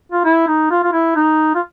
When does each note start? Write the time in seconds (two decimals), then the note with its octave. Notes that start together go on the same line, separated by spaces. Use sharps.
0.12 F4
0.25 E4
0.48 D#4
0.71 F4
0.84 F4
0.93 E4
1.16 D#4
1.55 F4